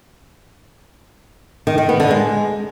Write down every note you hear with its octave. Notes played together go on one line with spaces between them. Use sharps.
D#3
D#3
B3
D3
G#3